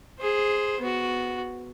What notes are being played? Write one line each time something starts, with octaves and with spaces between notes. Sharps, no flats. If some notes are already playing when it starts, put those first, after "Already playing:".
G#4 C5
B3 F#4